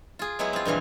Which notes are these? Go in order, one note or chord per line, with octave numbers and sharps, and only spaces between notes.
F4 G#4
F#3 G#3 B3 E4 G#4
C4 F4
G2 A#2 E3 F3